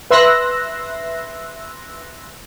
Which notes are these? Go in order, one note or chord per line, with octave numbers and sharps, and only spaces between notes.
B4 E5 C6 E6 F#6 A#6